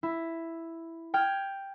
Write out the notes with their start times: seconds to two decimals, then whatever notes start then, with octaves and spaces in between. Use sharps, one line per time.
0.03 E4
1.14 G5 F6 G#6